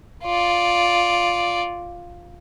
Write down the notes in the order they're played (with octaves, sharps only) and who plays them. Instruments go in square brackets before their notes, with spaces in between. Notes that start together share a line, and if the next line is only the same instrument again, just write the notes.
[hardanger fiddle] F4 D5